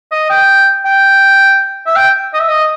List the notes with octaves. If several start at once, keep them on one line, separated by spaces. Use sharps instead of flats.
D#5
G5
G5
E5
G5
D#5
E5
D#5